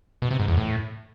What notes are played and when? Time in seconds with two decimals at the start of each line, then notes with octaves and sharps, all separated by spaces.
0.22 B2
0.31 C3
0.40 G#2
0.48 E2
0.57 A2